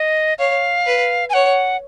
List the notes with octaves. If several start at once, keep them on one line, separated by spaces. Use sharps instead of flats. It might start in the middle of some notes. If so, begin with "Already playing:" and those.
Already playing: D#5
C#5 F5
B4
G#5
C#5 F#5